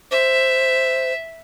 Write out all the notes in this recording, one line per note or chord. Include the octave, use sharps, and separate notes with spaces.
C5 E5